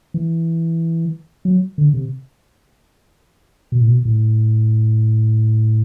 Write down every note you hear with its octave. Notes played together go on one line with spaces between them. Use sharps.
E3
F#3
D3
C3
B2
A2
B2
A2